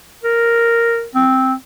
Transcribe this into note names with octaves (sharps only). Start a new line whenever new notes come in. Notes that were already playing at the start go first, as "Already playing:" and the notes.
A#4
C4